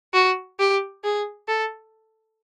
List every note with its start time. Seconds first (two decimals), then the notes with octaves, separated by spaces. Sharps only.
0.14 F#4
0.59 G4
1.04 G#4
1.48 A4